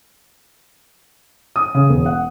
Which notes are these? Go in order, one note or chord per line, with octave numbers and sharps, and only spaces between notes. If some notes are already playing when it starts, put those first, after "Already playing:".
D#6
C#3
E1
F#5